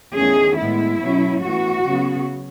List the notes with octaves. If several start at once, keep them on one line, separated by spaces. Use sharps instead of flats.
E2 D#3 A3 C#4 G#4
A2 G#3 B3 E4
B2 F#3 C#4
A2 E3 B3 F#4
C#3 F#3 B3